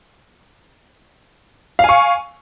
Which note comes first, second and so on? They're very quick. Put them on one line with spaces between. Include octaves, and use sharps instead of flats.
F5 G#5 C#6